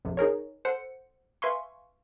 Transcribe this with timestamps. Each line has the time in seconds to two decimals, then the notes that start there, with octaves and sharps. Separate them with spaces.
0.05 A#1 F2 C3
0.17 D#4 G#4 A#4 C#5
0.65 A4 C5 F#5 C#7
1.42 B4 E5 F5 G#5 C6 C#6